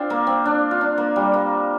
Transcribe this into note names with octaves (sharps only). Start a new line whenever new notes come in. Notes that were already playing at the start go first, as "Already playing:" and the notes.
Already playing: C4 D4 F4
A#3
C4
D4
F4
D4
A#3
G3
A#3